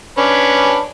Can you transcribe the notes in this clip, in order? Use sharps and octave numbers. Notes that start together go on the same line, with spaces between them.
C#4 D4 B4